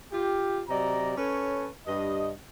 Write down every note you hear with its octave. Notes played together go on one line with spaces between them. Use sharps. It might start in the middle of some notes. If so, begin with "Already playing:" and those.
F4 G4
C3 F#3 D5 D#5 A#5
C#4 A4 B4 C#5
G2 D#5